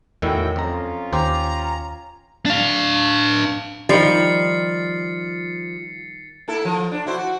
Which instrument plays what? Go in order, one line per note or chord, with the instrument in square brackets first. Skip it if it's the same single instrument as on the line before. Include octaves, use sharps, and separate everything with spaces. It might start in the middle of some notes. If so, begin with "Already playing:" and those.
[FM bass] E2 [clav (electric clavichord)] A2 D#3 E4 [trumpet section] C#4 F#4 G5
[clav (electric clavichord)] F2 A#5 [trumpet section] C#4 F4
[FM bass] D#2 [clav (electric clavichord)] G4 C5 [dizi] A#5
[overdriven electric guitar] D4 F5
[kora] D#3 G3 [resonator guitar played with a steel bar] F3 [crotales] A6 C7 C#7
[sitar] A#3 E4 A4
F3
D4
E4 F#4 C5
F#4